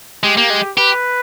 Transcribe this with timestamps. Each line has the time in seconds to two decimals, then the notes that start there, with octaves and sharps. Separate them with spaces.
0.23 G#3 G4
0.37 A#3
0.50 G#3
0.78 G4 B4